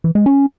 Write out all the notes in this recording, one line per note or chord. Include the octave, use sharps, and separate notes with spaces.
E3
G#3
C#4